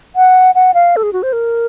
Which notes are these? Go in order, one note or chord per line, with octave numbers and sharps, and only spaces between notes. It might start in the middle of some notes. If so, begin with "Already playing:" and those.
F#5
F#5
F5
A4
G#4
F#4
C5
A#4